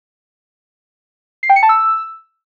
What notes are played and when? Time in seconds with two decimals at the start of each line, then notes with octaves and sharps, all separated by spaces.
1.43 C7
1.50 G5
1.56 C#7
1.63 A5
1.69 E6